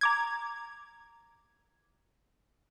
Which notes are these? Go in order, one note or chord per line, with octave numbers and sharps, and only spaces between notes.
A#5 D6 G#6